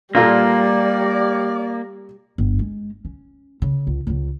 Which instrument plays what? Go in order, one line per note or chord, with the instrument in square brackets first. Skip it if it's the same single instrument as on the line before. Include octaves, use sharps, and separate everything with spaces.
[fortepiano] A#2 F4 A4 [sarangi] G3 [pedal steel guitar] A#3 [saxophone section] D5
[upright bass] G1
G#3
C#4
C#3
C#2
C#2 C#3